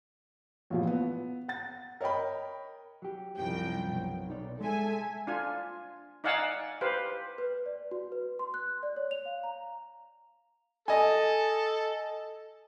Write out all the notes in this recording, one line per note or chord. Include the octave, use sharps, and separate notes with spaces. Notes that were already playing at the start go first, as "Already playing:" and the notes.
A1 A#2 F3
B3
F#5 A6
A#4 C#5 D#5 G5 B5
F#3 G4
C2 F#2 F3 G5
B1
D#4 C#5 D5
G#3 A4 E5 G#5
D4 F4 G#5
D#4 D5 F5 F#5 G#5 E6
G4 B4 C5 F5
B4
D5
F#4
B4
C6
F#6
D5
C#5
F7
F5
A#5
A4 D#5 G#5